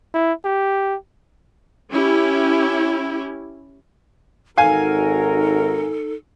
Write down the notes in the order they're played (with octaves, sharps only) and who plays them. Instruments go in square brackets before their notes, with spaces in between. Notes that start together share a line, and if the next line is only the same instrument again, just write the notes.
[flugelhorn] E4
G4
[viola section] C#4 E4 G4
[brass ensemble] G#1 F#4 A#4 [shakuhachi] D#4 [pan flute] A4 [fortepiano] F5 G#5